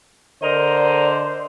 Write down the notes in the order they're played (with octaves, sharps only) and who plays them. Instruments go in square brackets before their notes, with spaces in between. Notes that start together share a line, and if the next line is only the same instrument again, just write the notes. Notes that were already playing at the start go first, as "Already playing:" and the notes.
[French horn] D3 [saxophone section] A#4 D#5 [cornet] C5 [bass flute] D5